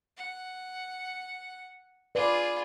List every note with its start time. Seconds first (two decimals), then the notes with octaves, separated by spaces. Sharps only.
0.17 F#5
2.15 F4 G#4 B4 D5